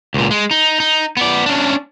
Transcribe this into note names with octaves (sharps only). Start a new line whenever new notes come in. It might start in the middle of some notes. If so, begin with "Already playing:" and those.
C#2 A#2
G#3
D#4
D#4
B3 D5
C#4 D4